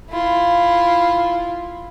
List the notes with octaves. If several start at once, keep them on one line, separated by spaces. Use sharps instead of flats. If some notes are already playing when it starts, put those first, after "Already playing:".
E4 F4